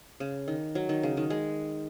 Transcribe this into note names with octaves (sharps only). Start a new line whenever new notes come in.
C#3
D#3
F#3
D#3
C#3
D#3
G#3